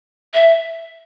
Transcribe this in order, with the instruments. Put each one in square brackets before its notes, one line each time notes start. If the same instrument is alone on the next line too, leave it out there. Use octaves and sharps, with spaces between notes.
[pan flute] E5